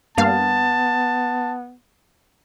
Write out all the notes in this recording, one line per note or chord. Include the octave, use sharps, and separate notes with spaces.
G2 A#3 B3 F5 A5